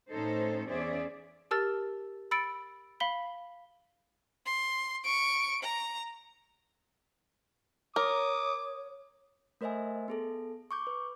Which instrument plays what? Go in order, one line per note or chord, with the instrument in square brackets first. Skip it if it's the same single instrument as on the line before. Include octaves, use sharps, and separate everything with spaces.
[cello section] A2 C#4 D#4 A4 C5
E2 C#4 G#4 C5 D5 E5
[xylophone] G4 A#4 A5 E6 F6 A6
B5 E6 A6 C#7 D7
F5 B5 B6 G7
[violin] C6
C#6 D7
A#5
[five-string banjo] A#4 [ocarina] C#5 [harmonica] D6 D#6
[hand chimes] A3 A#4 C5 D#5 E5 G#5
B3 G#4 A4
C#6 D6 G6
B4